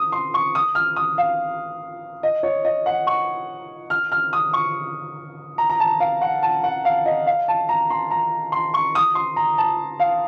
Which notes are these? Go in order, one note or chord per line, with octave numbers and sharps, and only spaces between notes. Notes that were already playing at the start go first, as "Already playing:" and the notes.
Already playing: D#6
C6
C#6
D#6
F6
D#6
F5
D#5
C#5
D#5
F#5
C#6
F6
F6
D#6
C#6
A#5
A#5
A5
F5
F#5
A5
F#5
F5
D#5
F5
A5
A#5
C6
A#5
C6
C#6
D#6
C6
A#5
A5
F5